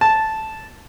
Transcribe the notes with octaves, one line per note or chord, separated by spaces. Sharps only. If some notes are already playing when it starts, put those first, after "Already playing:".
A5